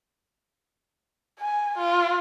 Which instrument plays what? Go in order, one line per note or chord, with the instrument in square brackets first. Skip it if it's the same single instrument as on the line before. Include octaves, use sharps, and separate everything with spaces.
[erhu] G#5
F4